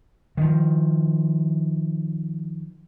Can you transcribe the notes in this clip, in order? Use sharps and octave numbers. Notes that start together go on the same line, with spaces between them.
D#3 F3